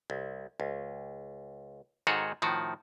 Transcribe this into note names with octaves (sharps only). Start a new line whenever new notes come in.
C2
C#2
G#2 D#3 F#4 G#4 A4 C#5
A2 D#3 F3 F#4